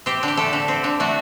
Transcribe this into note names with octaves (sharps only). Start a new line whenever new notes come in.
C4 G4
D3
G4
A3 A4
D3
C4
D3
A3 F#4